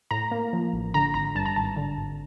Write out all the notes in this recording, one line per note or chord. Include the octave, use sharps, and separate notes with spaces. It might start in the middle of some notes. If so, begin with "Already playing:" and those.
A2 A#5
A#3
F3
A1
D3 A#5
G#1 A#5
G2 A5
A#5
G#1 A5
D3
G#1